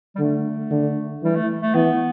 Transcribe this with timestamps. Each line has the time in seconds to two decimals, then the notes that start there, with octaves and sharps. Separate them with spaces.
0.15 G3
0.19 D3 A3
0.71 D3
1.23 E3 G3
1.35 A3
1.62 A3
1.74 E3 B3